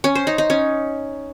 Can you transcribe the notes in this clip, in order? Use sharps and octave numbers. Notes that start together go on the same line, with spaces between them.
C#4
C5
D#4
D#4
C#4